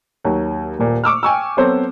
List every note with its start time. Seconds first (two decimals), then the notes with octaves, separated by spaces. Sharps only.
0.24 D#2 F#3
0.79 D#1 A#2
1.04 C#6 D6 E6 F6
1.23 G5 G#5 C#6 E6
1.57 F#3 B3 C4 A4 C5 C#5